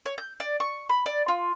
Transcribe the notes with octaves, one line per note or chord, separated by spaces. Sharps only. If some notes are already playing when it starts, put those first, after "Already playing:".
C#5
G6
D5
C#6
B5
D5
F4